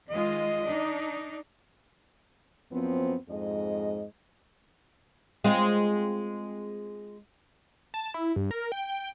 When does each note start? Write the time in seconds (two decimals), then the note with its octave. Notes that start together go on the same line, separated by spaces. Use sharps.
0.10 D#3 G#3 F4 D#5
0.65 D4 D#4
2.71 F#2 F3 B3 C4
3.29 F2 G#2 G#3 D#5
5.44 G#3 C4 F4
7.94 A5
8.14 E4
8.36 G2
8.51 A#4
8.72 G5
8.90 G5